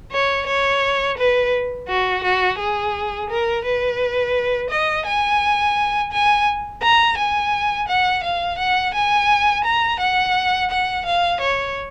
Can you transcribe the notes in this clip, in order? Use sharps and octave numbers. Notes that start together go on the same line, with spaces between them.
C#5
C#5
B4
F#4
F#4
G#4
A#4
B4
D#5
G#5
G#5
A#5
G#5
F#5
F5
F#5
G#5
A#5
F#5
F#5
F5
C#5